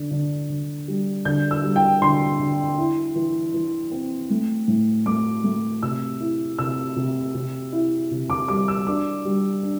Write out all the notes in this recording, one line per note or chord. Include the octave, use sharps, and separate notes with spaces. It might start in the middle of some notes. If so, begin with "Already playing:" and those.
Already playing: D3
D3
D3
G3
D3 G6
E6
G3
G5
D3 C6
D3
E4
E3
E3
C4
A3
A2
A3 D6
A3
C3 E6
E4
C3 E6
C3
C3
E4
C3
D6
G3 D6
E6
D4 D6
G3
D4